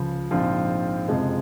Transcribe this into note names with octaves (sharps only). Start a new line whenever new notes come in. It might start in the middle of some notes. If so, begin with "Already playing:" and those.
Already playing: C#2 C#3 F3
A#1 G#2 F3 C4 F4
F#1 F2 C3 F3 G#3